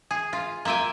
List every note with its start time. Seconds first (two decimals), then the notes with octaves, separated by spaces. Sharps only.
0.11 G#4
0.33 F4
0.65 A#3 F4 E5 G5 G#5